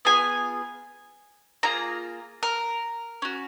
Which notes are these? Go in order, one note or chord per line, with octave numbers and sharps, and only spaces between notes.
B3 F4 G#4 G#5
A#3 F4 G#4 A#5
A#4
C#4 F#4